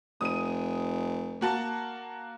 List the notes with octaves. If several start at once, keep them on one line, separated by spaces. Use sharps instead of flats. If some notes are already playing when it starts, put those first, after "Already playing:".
F1 D#6 D#7
A#3 F#4 A5